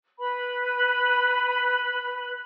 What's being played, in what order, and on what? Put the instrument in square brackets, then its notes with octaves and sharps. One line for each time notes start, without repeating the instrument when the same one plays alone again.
[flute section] B4 B5